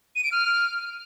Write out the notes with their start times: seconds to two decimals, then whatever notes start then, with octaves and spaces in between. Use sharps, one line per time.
0.16 D#7
0.24 D7
0.32 F6